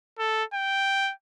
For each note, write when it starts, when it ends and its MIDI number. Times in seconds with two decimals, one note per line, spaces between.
0.19 0.44 69
0.54 1.12 79